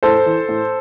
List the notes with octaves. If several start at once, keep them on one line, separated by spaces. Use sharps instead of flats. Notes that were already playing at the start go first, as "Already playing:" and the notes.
A2 A4 C5
E3
A2